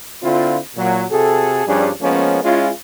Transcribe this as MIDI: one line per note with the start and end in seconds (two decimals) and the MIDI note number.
0.23 0.58 50
0.23 0.58 60
0.23 0.58 64
0.23 0.58 65
0.77 1.05 46
0.77 1.05 54
1.10 1.66 48
1.10 1.66 66
1.10 1.66 68
1.10 1.66 69
1.66 1.90 43
1.66 1.90 53
1.66 1.90 55
1.66 1.90 61
1.66 1.90 62
1.66 1.90 68
2.01 2.42 53
2.01 2.42 56
2.01 2.42 58
2.01 2.42 59
2.01 2.42 61
2.43 2.70 56
2.43 2.70 61
2.43 2.70 64
2.43 2.70 65